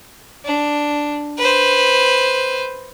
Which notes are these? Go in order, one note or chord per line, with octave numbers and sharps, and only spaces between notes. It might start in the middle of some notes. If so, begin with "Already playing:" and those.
D4
B4 C5